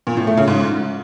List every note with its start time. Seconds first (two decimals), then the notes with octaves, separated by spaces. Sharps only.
0.07 A#2
0.17 A2
0.27 A3
0.37 C#3
0.48 G#2